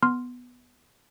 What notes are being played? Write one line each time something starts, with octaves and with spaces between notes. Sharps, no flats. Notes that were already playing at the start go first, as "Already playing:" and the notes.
B3 C6 F6